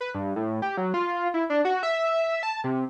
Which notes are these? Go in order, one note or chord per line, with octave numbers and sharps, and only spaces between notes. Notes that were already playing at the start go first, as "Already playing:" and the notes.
B4
G2
A2
G4
F#3
F4
E4
D4
F#4
E5
A5
C3